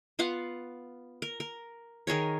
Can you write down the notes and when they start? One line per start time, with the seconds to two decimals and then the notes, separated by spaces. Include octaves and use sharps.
0.19 B3 F4 F5 F#5
1.22 A#4
1.40 A#4
2.07 D#3 G#4 A#4 C#5